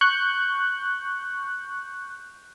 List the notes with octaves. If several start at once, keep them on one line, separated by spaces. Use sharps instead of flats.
C#6 F#6 G6